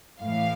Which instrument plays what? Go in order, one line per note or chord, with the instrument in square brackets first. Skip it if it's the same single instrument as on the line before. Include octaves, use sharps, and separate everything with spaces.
[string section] A2 E3 F5